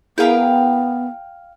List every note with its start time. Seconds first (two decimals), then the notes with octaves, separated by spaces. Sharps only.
0.18 B3 E4 G#4 A#4 F5 G5